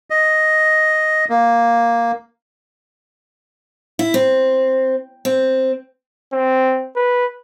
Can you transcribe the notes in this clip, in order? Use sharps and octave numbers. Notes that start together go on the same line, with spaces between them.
D#5
A#3
E4
C4
C4
C4
B4